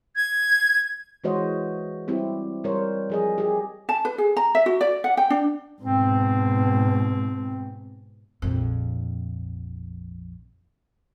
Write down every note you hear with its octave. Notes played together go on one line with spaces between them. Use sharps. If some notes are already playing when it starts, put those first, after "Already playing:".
G#6
E3 G#3 F#4 C5 C#5 D#5
G3 C4 E4 G4
G3 A#4 C5 C#5
F3 G#4 D#5
G4 G#4
A5
B4
G#4
A#5
E5
F#4
D5
F#5
G5
D4
G#2 B2 C4
A#1 F2